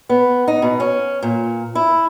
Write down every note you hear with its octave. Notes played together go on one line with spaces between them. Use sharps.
B3
D#4
B2
C#4
A#2
E4